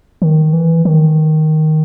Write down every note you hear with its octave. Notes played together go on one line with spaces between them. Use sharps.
D#3
E3
D#3